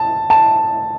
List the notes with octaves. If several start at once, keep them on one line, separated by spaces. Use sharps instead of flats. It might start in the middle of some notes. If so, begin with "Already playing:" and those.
Already playing: A5
A5